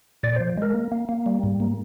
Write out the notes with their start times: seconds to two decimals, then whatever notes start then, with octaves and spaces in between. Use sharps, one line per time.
0.23 A#2 D5
0.36 F3 C5
0.58 G#3 A#4
0.74 A#3
0.92 A#3
1.09 A#3
1.26 G3
1.43 G#2
1.60 A#3